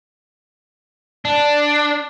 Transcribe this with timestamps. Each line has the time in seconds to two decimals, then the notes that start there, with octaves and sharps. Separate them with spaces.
1.25 D4